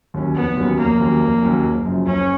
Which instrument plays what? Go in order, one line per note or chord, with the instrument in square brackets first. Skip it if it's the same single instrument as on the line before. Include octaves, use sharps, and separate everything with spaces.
[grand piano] D#2 D#3 F#3 C#4
[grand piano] F1 [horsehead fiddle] B3
[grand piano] D#2 D#3 F#3 C#4
[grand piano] F1 [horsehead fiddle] A#3
[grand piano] D#2 D#3 F#3 C#4
F1
D#2 D#3 F#3 C#4
F#1
F#2 C#3 F3
[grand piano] F#1 [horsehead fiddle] C#4